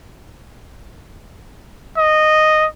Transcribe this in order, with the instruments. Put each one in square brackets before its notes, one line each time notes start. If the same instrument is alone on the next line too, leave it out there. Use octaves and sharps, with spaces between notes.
[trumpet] D#5